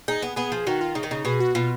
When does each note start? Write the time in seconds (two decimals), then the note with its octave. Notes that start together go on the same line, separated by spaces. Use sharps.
0.08 D#4 G#4
0.22 B3
0.36 B3 G#4
0.52 F3
0.67 D#3 F#4
0.81 F4
0.95 C#3 D#4
1.03 D#3
1.11 C#3 D#4
1.25 B2 G#4
1.40 F#4
1.55 B2 F4